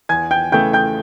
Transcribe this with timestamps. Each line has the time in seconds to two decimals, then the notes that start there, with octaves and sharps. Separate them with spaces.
0.09 E2 G#5 G#6
0.31 G5 G6
0.52 C#3 E3 A3 G5 G6
0.73 G5 G6